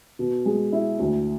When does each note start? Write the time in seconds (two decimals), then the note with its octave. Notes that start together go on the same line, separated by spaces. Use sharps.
0.19 B2
0.45 G#3
0.72 E4
0.99 D2